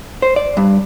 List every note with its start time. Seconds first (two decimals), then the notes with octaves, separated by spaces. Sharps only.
0.22 C5
0.36 D5
0.57 G2